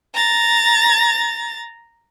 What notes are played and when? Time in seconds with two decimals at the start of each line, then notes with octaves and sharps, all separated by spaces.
0.14 A#5 A6